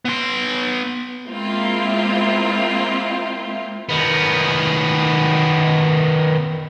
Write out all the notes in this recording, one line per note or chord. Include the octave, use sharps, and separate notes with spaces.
B3 C6
G#3 A#3 C4 E4 F4
D#3 B3